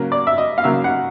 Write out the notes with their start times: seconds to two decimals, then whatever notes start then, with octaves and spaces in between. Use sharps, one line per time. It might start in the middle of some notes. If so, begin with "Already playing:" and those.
Already playing: C#3 F#3 A#3
0.12 D5
0.27 E5
0.38 D#5
0.58 F5
0.64 C#3 F#3 A#3 E5
0.84 F#5